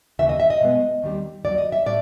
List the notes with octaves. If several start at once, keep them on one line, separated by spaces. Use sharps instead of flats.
D#2 C#3 E3 E5
D#5
E5
D#5
B2 G#3 B3
D#2 D#3 G3 C4
D#2 D#3 F#3 D5
D#5
E5
A2 D5